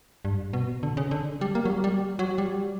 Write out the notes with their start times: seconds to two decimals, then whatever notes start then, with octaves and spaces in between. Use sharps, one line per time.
0.25 G2
0.53 B2
0.83 D3
0.97 C#3
1.11 D3
1.41 G3
1.55 A#3
1.65 F#3
1.70 G3
1.84 G3
2.19 F#3
2.38 G3